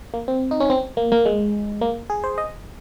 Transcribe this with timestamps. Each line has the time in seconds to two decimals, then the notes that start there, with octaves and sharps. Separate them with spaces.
0.14 A#3
0.28 C4
0.51 D#4
0.60 C#4
0.70 C4
0.97 A#3
1.12 A#3
1.26 G#3
1.81 A#3
2.10 G#4
2.24 C5
2.38 D#5